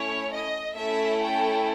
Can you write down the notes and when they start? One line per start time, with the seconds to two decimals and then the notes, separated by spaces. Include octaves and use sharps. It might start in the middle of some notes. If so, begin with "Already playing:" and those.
Already playing: A3 C#4 E4 C#5
0.31 D#5
0.76 A3 C#4 E4 A4 E5
1.21 G5